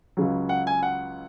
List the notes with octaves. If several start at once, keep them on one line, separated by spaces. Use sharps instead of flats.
C#2 C#3 F#3
F#5
G#5
F#5